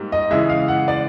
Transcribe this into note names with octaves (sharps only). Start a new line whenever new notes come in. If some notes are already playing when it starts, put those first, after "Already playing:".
Already playing: G#2 G3 A#3
D#5
C#3 E3 G#3 E5
F5
F#5
D5